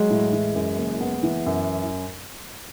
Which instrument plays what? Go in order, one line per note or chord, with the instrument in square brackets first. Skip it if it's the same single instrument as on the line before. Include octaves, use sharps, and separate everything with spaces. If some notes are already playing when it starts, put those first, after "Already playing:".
Already playing: [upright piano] F#3 [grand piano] G#3
[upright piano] A2
E3
F#2
F#1
B3
E3
F#2